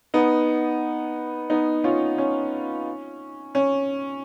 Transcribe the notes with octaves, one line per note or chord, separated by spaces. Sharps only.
B3 D#4
B3 D#4
C#4 F4
C#4
C#4